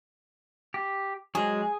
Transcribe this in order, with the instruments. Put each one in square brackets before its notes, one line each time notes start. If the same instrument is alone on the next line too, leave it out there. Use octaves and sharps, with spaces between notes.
[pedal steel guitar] G4
[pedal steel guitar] F#3 G#3 [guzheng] G#4